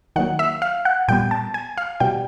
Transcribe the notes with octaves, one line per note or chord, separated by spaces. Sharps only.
D#3 F#3 A#3 F#5
E5
F5
F#5
A#2 G3 B3 G5
A5
G#5
F5
B2 G3 B3 G5